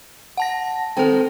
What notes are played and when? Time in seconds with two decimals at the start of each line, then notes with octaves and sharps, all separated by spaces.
0.37 F#5 A5 A#6
0.97 D#3 C4 A4 G5